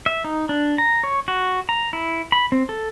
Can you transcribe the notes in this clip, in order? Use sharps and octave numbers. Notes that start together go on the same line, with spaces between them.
E5
D#4
D4
A#5
C#5
F#4
A#5
E4
B5
C4
A4